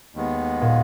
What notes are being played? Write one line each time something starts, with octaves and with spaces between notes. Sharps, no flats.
D#2 D#3 G#3 B3
A#2